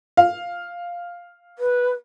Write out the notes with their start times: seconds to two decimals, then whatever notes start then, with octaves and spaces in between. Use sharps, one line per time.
0.17 F5
1.58 B4